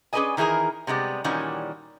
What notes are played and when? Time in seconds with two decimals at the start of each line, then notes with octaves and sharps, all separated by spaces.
0.13 C#4 G#4 B4 D5 D#5 G#5
0.37 D#3 E3 E4 G#4 A#4
0.87 C3 G3 G#3 B3
1.24 A#2 D#3 E3 G3 C#4 F#4